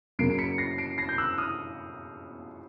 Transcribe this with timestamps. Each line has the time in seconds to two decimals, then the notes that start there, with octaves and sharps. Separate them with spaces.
0.19 F#2 C#3 F#3 A#3 C7 D7
0.30 D7
0.38 B6 C#7
0.58 A#6 C7
0.78 C7 D7
0.98 A#6 C7
1.09 G6
1.18 E6 F#6
1.38 D#6 F6